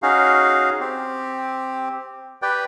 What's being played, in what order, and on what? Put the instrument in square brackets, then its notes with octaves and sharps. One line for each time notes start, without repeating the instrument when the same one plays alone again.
[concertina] C#4 D#4 F#4 G#4 F5
C4 G4
G4 B4 D5 G5